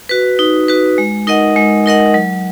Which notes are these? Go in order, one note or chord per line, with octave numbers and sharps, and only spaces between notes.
F#4 B4
D#4
F#4 B4
G#3
D#4 A#4 D#5 F#5
G#3
D#4 A#4 D#5 F#5
F#3